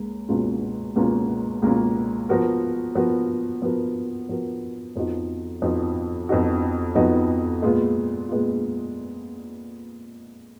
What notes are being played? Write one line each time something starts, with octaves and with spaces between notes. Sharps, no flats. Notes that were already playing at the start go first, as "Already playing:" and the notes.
Already playing: C#2 A#3
C#2 B2 A#3 C#4 F4
C#2 B2 A#3 C#4 F4
C#2 B2 A#3 C#4 F4
F3 B3 F#4 A#4
F3 B3 F#4 A#4
F3 B3 F#4 A#4
F3 B3 F#4 A#4
F2 F3 B3 D#4 F#4
F2 F3 B3 D#4 F#4
F2 F3 B3 D#4 F#4
F2 F3 B3 D#4 F#4
A#2 G#3 B3 F4
A#2 G#3 B3 F4